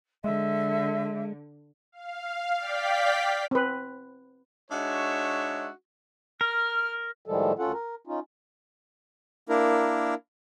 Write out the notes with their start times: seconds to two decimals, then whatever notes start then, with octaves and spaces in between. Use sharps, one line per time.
0.24 D3 G#3 E5
1.92 F5
2.57 D5 F5 G5 B6
3.51 C4 B4
4.71 G#3 D4 D#4 F#4 C#5 E5
6.41 A#4 F6
7.26 A2 D#3 F3 G3 G#3 A4
7.59 D2 C#4 F4 A4 F#5
7.73 A#4
8.07 C#4 D#4 F4
9.49 A#3 D4 E4 A#4